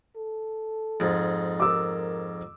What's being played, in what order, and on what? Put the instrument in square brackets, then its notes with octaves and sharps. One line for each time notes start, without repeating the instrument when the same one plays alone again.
[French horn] A4
[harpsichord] F2 G#2
[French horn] A#4 [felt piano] D6 E6